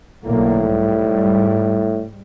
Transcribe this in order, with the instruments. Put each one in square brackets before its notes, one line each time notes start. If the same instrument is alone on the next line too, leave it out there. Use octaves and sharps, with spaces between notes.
[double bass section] B1 D3 A#3 [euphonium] A2
[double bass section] G#2 G3